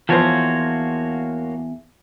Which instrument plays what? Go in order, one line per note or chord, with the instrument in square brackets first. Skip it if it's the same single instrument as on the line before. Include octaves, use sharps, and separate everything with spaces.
[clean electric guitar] E2 [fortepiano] F3 C5 [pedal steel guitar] A#3 F#4 C#5